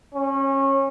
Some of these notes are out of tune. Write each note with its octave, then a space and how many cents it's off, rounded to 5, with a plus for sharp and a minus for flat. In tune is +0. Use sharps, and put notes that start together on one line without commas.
C#4 -25